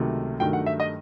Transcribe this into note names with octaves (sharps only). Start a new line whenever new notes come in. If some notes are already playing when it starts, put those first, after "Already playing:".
Already playing: C#2 C3 D#3 F#3 A3
G2 D#3 F#3 A3 G5
F#5
E5
D#5